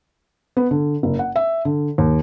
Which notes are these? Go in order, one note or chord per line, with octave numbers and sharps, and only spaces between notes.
B3
D3
F#1
F#5
E5
D3
D#2